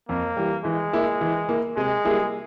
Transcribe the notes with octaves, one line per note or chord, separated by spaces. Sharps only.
F2 A#3
E3 G3
E3 G#3
A#3 E4
E3
A#3 E4
C3 G#3
G3 A#3 E4 G#4